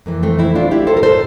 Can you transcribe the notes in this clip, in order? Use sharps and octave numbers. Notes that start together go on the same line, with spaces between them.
F2 E3 A#3
A3 C4
C4 E4
D4 F4
E4 G4
A4 C5
A#4
A4 C5